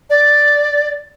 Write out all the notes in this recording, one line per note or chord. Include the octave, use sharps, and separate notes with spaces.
D5